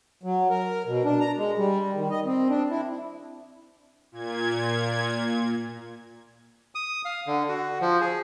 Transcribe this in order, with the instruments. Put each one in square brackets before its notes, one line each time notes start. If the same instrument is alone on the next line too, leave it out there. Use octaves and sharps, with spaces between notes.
[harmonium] F#3
A#4
B2
D4
A#5
G#3
G3
D#3
D#5
C4
D4
E4
[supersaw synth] A#2 G#6
[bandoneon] D#6
F5
D3
F#4
F3
G#4